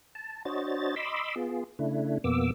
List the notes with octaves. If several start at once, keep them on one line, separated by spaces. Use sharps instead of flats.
A5
D4 F#4 C5 C#5 D#5 A6
D#5 B5 C6 D6 E6
B3 F4 G#4
C#3 A3 D4 E4
F2 B2 A#3 B3 D6 E6